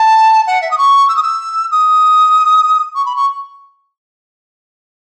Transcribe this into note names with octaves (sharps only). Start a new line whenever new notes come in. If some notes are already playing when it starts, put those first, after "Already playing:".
Already playing: A5
F#5
E5
D#6
C#6
E6
D#6
E6
D#6
C#6
B5
C#6